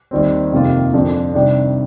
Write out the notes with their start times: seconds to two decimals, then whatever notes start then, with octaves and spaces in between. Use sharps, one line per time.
0.11 D#2 D#3 G3 C4
0.52 F2 C3 D#3 A#3 F4
0.94 F2 D3 F3
1.34 C3 D#3 G3 D4